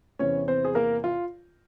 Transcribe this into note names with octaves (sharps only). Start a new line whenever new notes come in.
E2 C3 E3 C#4 C#5
C4 C5
G#4
A#3 A#4
F4